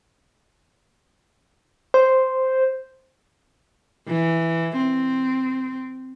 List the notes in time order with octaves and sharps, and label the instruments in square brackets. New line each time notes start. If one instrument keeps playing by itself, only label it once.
[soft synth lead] C5
[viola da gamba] E3
C4